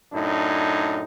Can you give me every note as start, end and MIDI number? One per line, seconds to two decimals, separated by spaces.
0.13 1.04 42
0.13 1.04 45
0.13 1.04 62
0.13 1.04 63